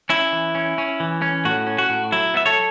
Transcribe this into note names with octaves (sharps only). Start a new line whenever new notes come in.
C#4 E4
E3
C#4
C#4
E3
C#4
A2 F#4
C#4
F#4
A2
F#3 E4
B3 E5
A4 C#5